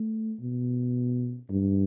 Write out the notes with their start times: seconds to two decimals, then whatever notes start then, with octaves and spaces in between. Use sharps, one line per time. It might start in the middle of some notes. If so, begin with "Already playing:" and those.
Already playing: A3
0.40 B2
1.50 G2